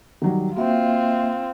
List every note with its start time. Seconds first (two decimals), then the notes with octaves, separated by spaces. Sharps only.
0.22 D#3 F#3 G3
0.56 A#3 C4 F4 F#4 E5